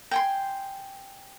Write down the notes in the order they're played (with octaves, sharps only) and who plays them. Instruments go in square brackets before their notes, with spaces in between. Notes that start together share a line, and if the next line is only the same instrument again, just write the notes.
[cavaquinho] G5 G#5 C6